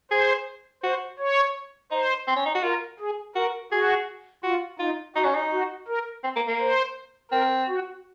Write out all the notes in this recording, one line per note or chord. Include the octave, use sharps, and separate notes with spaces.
G#4 C5
F#4 C5
C#5
D#4 C5
C4
C#4
D#4
F#4
F4 A#4
G#4
F#4 A#4
F#4 G#4
F4 F#4
D#4 F4
D#4 F#4
C#4
D#4
F#4
A#4
C4
A#3
A#3
C5
C4 A#4
F#4